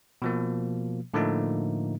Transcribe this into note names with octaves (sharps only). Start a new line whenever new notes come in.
B2 F3 A#3
A2 D3 F3 A3 A#3 D#4